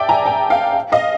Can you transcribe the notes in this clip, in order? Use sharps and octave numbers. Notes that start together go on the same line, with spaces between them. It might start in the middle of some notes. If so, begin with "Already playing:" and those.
Already playing: D5 E5 G5 A5
G#5 A#5
G5 A5
F5 G5
D#5 F5